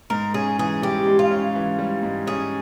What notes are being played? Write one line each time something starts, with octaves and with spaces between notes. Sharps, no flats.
G#2 A#4
C#4 G#4
E3 G#4
G3 G4
G#2
F4
C#4
E3
G3
G#2
C#4 G#4